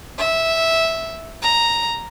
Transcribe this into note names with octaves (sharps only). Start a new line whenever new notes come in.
E5
A#5